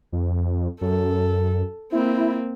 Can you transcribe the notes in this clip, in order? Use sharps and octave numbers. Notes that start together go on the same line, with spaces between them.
F2
F#2 A4
A#3 C4 E4